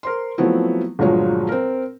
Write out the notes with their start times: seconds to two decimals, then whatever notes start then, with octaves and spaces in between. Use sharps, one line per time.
0.03 A#4 C5 C6
0.38 F3 F#3 A3 B3 C4 E4
0.99 G1 A#2 F3 F#3 G#3 C#5
1.49 C4 A#4